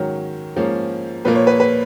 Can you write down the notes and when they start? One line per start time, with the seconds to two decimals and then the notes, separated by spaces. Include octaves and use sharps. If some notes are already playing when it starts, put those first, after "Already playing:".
Already playing: G#2 D#3 F#3 C#4
0.56 G#2 F3 A#3 C#4
1.25 A#2 F3 A#3 B4
1.35 C#5
1.47 B4
1.60 B4